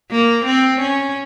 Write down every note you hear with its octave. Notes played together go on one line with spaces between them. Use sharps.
A#3
C4
C#4